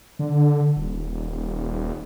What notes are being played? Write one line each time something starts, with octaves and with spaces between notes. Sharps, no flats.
D3
D#1